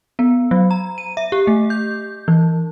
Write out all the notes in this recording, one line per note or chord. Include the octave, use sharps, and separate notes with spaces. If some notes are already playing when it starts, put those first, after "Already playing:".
B3
F#3
A#5
D#7
E5
G4
A3
G6
E3